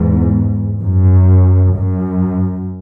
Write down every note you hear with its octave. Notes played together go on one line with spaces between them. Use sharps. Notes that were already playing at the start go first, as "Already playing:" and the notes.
Already playing: E2 G#2
F#2
F#2